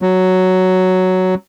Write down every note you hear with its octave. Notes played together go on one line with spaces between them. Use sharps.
F#3